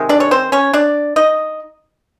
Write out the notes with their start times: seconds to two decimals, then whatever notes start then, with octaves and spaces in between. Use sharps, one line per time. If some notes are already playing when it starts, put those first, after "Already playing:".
Already playing: C3 D#3 G#3
0.09 D4 D5
0.20 C#5
0.31 C4 C5
0.52 C#4 C#5
0.73 D4 D5
1.16 D#4 D#5